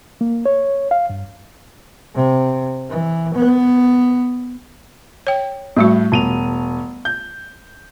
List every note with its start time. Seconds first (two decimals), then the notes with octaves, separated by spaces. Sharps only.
0.21 A#3
0.46 C#5
0.91 F5
1.10 G2
2.15 C3
2.90 E3
3.34 B3
5.27 C#5 G5
5.77 A2 G3 A3 F#4
6.12 E1 D#7 F7
7.05 G6